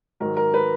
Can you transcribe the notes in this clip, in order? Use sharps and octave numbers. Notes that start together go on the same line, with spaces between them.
G#2 D#3 F#3 A#4
A#4
B4